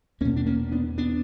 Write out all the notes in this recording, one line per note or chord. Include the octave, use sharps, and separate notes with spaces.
E2 B2 A#3 C#4
D4
A#3 C#4
B3 D4
B3 D4